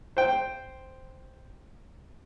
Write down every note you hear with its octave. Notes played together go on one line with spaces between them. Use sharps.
C5 G5